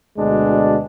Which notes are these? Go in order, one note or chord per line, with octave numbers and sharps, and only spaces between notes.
D2 B2 G#3 D4